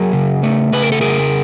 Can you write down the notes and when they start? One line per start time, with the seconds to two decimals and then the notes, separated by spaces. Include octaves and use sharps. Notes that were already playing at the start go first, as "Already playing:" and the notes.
Already playing: F#3 G#4 A#4
0.13 C#3
0.43 A3
0.73 C#3 B4
0.82 A#4
0.92 A4
1.01 C#3 G#4 A#4